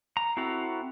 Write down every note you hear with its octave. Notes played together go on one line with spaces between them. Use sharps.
A#5
C4 E4 F#4 A4 A#5